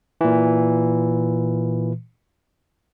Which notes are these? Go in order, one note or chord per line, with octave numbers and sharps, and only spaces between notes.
A#2 E3